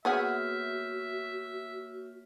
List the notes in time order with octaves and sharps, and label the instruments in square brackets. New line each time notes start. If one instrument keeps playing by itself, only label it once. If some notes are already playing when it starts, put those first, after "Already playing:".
[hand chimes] A#3 C#5 F6 [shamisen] B3 G#4 F#5 [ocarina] F#4 [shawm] E5